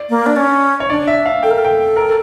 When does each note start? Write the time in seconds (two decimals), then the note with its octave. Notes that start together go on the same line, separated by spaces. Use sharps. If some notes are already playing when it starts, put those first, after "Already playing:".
Already playing: D5
0.10 A#3
0.26 D4
0.36 C#4
0.80 C#5
0.90 D4 D5
1.07 E5
1.26 F5
1.43 A4 G5
1.51 A#4
1.58 A4
1.65 G5
1.96 A#4